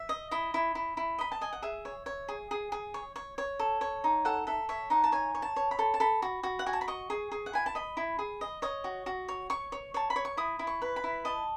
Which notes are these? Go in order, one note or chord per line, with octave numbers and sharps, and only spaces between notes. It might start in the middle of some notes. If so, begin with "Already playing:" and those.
Already playing: E5
D#5
E4 D#5
E4
E4
E4
D#5 B5
A5
D#5 G#5
F#5
G#4 E5
C#5
C#5
G#4
G#4
G#4
C#5
C#5
C#5
A4
C#5
D#4
A4 F#5
A4 E5
C#5 E5
D#4 F#5
A5
C#5 G#5
C#5
A5
C#5
B5
A4
A5
A4 B5
F#4
F#4
F#5
F#4 G#5
A5
B5
D#5 C#6
G#4
G#4
F#5
E4 G#5
A5
D#5 B5
E4
G#4
D#5
C#5 D#5
F#4
F#4
C#5
C#5 C#6
C#5
C#5 A5
B5
C#5
C#6
E4 D#6
E4
C#6
B4
B5
E4
D#5 A5